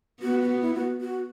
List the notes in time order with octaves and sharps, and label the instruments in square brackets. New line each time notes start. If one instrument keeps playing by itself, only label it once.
[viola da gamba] B3 [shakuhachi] F#4
[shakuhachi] F#4
E4
F#4
F#4